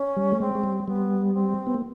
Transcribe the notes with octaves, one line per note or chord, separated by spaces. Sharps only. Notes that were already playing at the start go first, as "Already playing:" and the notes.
Already playing: C#4
G3
A3
G#3 C4
G#3
G3
G3 B3
C4
B3
A#3